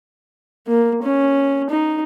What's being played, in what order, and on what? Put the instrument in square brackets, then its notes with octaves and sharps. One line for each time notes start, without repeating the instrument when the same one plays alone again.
[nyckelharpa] A#3
C#4
D#4